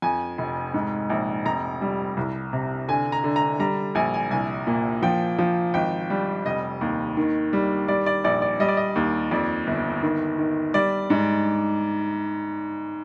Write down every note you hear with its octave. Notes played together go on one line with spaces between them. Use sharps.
F2 G#5
F1
G#2
A#1
F1 A#5
G3
C2
C3
D3 G#5
A#5
D3
A#5
G3 A#5
A#1 G#5
G#5
C2 G#5
A#2
F3 G5
F3
G#1 G5
G3
F1 D#5
D#2
D#3
G3
G3 D5
D5
A#1 D5
D5
G3 D#5
D5
D#5
D#2
F2 D5
G1
D#3
D#3
G3 D5
G#2